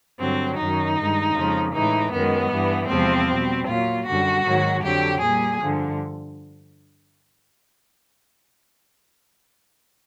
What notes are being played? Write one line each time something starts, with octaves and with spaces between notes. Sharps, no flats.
G2 D3 F#3 C4
F#2 D#3 F#3 D#4
G2 D#3 G#3
F2 C#3 F3 G#3
A2 E3 G#3 D#4
F#2 D#3 G#3 B3
G2 E3 G3
E2 C3 F3 G#3 C4
B2 G3
A#2 F#3 F4
F#2 D3 G3 F#4
G#2 D#3 F#3
F2 D3 F#3 G4
A#2 G3 G#4
G2 D3 F3